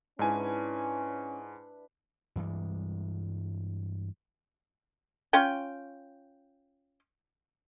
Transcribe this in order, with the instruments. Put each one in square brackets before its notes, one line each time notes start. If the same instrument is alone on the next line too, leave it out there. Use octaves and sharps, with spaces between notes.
[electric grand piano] G#2 G#5 [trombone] C#4 [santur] D4 E4 B4
[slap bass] G2 E3 G3 G#3
[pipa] C#4 F4 G5